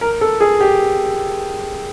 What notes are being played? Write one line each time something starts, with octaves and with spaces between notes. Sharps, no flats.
A#4
A4
G#4
G4